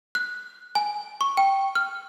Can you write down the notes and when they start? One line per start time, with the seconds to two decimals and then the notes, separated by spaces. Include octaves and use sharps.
0.15 F#6
0.75 G#5
1.21 C#6
1.37 G5
1.75 F6